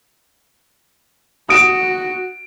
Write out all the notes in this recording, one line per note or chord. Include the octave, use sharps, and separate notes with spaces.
F#4 D#6 D7 E7